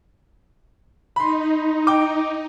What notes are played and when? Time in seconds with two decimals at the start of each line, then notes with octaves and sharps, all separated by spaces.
1.16 D#4 B5 C6
1.87 G5 D6